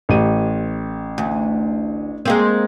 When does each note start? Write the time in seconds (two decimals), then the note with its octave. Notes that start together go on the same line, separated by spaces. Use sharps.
0.09 A1 G4 D#7
1.18 D2
2.25 G#3 A#3 C4